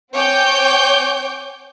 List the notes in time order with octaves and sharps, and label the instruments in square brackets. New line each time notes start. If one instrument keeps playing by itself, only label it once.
[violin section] C4 C#5 G5 G#5 D6 G6